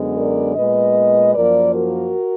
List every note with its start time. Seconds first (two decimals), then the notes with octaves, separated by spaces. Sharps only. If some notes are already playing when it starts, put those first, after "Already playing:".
Already playing: F#2 D3 G#3 B3
0.16 A#4 D5
0.56 A#2 G#3 B3 B4 D#5
1.35 F#2 F3 A#3 A#4 D5
1.74 F#4 A#4